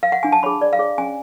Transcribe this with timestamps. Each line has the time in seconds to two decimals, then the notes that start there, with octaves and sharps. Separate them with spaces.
0.03 F5
0.12 F#5
0.23 D4 G#5
0.32 A5
0.43 G#4 C#5 B5
0.61 D4 D5
0.73 F5
0.79 G#4 C#5
0.98 C#4 G#5